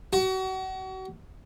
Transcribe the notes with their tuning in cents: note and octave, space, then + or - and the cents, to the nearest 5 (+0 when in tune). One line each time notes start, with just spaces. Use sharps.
F#4 +35